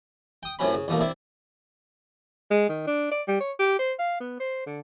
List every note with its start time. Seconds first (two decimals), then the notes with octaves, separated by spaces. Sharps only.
0.43 G5 D#6
0.59 F#2 A2 C3 F#3 C#4 B5
0.74 C#3
0.88 A1 B2 A3 A#3
1.00 C3 D4 E4
2.51 G#3
2.69 D#3
2.87 D4
3.12 D5
3.28 G3
3.41 C#5
3.59 G4
3.79 C5
3.99 F5
4.21 B3
4.40 C5
4.67 D3